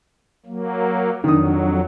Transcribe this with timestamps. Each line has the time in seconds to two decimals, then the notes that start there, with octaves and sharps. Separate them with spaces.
0.46 F#3 A#3
1.24 F2 D#3 F#3 D4 D#6